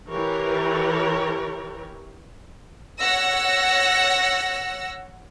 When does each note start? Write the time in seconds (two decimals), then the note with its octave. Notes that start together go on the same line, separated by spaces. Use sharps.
0.10 E3 G4 A#4 C#5
3.00 C#5 F#5 E6 A#6